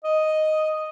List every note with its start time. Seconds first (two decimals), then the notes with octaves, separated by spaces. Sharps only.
0.04 D#5